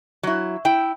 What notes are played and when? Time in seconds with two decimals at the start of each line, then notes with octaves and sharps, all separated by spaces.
0.23 F#3 E4
0.65 E4 G5